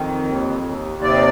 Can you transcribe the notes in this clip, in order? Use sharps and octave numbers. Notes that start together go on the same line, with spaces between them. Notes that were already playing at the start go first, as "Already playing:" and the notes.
Already playing: F2 D#3
D#2
D#2
C3 D5